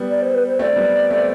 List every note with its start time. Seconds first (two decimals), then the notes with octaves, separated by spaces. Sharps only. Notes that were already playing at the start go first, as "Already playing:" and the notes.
Already playing: G3 B3
0.09 D5
0.21 C5
0.34 B4
0.47 C5
0.59 A3 C4 D5
0.76 G3 B3
1.10 A3 C4